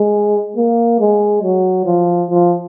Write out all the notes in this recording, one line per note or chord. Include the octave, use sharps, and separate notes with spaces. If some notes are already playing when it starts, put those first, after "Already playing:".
Already playing: G#3
A#3
G#3
F#3
F3
F3